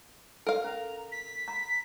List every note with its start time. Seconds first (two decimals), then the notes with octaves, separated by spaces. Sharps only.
0.47 A4 A#4 F5
0.64 C#4 A#5
1.11 B6
1.48 A#5 B5